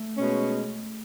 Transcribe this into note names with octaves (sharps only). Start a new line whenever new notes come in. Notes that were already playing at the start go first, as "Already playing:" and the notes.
Already playing: A3
B2 G#3 C#4